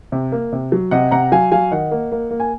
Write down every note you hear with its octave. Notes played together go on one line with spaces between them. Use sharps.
C3
A#3
C3
F#3
C3 D#5 F#5
C3 F#5 A#5
F#3 F5 G#5
F#3 F5 G#5
D#3 D#5 F#5
A#3
A#3
A#3
G#5